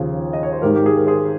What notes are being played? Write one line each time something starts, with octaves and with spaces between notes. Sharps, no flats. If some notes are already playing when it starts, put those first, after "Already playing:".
Already playing: D#2 C#3 F3 G#4
D#5
C#5
C5
G#1 G#2 D#3 G4 A#4
G4
G#4
A#4
G#4 C5